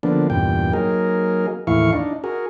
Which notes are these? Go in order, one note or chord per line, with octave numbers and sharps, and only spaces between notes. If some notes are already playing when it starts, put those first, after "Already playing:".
D3 F3 A#3 B3 D4
E2 G2 A#2 G5
F#3 A#3 D#4 G#4 A#4
D#2 A2 E3 E4 F5 C#6
D4 D#4
F#4 G#4 A#4